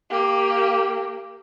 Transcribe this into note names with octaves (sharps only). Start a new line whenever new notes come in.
A#3 G4